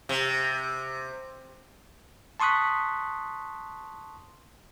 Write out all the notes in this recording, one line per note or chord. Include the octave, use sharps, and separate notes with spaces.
C3
A5 C6 C#6 D#6 F#6 B6